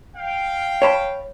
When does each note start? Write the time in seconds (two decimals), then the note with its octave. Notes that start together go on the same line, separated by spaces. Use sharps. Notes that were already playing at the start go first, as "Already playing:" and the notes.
0.17 F5 G5
0.82 C#5 A5 B5